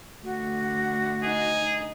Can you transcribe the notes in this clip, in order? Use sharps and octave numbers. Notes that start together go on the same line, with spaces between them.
D3 A3 F#4
D#4 G#4